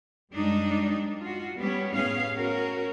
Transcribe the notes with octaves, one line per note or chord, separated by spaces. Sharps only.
F#2 G3 G#3 D4 D#4
F4 F#4
G3 B3 C#4
A2 B3 C#4 G#4 F5
C#4 F#4 A#4